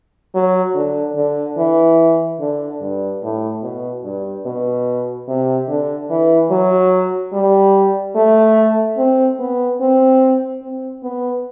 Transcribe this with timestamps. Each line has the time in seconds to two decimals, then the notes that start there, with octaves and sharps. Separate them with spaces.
0.35 F#3
0.75 D3
1.16 D3
1.58 E3
2.40 D3
2.81 G2
3.22 A2
3.63 B2
4.04 G2
4.46 B2
5.28 C3
5.69 D3
6.10 E3
6.51 F#3
7.33 G3
8.16 A3
8.98 C4
9.39 B3
9.80 C4
10.62 C4
11.03 B3